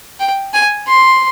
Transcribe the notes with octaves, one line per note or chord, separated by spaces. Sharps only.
G5
G#5
C6